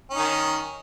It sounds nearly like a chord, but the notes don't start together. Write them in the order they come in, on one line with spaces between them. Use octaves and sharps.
C#4 D#4 D#3